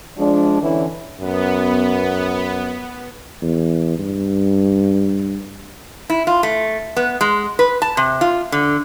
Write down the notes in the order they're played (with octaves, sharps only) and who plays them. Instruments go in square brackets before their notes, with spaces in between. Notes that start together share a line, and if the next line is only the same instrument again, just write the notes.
[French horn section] F3 G#3 D4
D3 E3 C#4 E4
[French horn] F#2 [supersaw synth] B3
[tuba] E2
G2
[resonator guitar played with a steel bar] E4
F4
A3
B3
G#3
B4
A5
C3
F4
D3